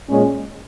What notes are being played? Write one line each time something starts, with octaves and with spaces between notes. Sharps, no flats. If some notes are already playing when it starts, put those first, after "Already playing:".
A#2 G#3 C#4